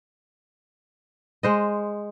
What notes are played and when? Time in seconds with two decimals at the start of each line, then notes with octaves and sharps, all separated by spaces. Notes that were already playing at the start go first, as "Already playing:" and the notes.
1.43 G#3 C5 D#5